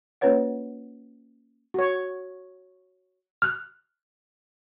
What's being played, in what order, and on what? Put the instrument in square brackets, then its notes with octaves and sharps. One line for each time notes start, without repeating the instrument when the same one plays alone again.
[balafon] A#3 C#4 F4 B4 C#5 F#5
[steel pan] F#4 C#5
[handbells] F6 F#6